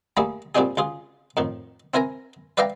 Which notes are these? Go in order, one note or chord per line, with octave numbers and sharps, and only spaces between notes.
G3 A3 A#3 E4 G#4
A#2 G3 C4 D4 D#4 G#4
C#2 F4 G#4
F2 A2 D#3
C4 E4 A#4 G#5 A#5
B4 D5 E5 F5 G5 A#5